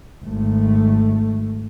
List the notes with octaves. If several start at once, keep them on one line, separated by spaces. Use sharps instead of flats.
G#1 A3